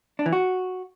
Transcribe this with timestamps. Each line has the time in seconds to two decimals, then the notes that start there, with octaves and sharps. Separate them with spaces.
0.19 D4
0.26 E3
0.33 F#4